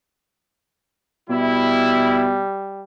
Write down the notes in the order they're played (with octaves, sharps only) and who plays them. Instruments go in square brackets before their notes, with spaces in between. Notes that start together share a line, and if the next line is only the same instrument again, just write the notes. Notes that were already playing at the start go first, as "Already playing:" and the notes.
[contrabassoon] B2 [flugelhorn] G3 [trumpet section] E4